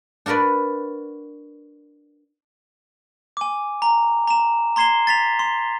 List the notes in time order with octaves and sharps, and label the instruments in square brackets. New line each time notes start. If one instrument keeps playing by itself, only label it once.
[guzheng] D4 F#4 A#4 B4 D5
[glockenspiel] G#5 D6
A#5
A#5 E7
A#5 C6 G#6 C7 E7 G7
A6 B6 F7
C6